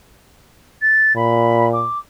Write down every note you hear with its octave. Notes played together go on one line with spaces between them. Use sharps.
A6
A#2 B5
D6